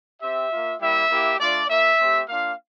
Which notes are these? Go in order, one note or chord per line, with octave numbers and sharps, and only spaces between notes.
C4 G4 E5
A#3 F4
G3 A#3 E4 G4 E5
A#3 E4 G4
A3 D4 F4 D5
A#3 F4 E5
A3 C4 G4
A#3 D4 F4 F5